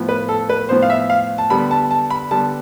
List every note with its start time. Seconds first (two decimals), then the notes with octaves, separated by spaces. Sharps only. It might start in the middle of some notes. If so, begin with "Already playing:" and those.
Already playing: A2 F3 B3
0.09 B4
0.29 A4
0.49 B4
0.69 A2 F3 B3 C5
0.82 F5
0.90 E5
1.10 F5
1.38 A5
1.50 D3 G3 B3 B5
1.71 A5
1.91 A5
2.10 B5
2.31 D3 G3 B3 A5